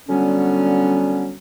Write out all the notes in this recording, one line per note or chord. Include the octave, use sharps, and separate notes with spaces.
D3 F#3 G3 B3 C#4